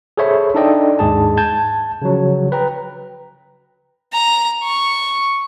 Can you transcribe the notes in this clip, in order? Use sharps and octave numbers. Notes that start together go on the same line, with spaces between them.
G#4 A4 C5 C#5 E5 B5
D4 D#4 A4 D5 D#5 G5
D#2 G#2 G#3 G#4 A5
A5 G6 G#6
C#3 F3 F#3
B4 G5 A#5
A#5
C#6